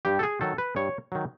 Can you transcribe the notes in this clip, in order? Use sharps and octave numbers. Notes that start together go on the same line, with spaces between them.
G2 G4
A4
G#4
D#3 F#3 A4
B4
G2 C#5
D#3 F#3